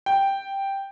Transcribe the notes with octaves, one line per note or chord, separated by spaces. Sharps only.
G5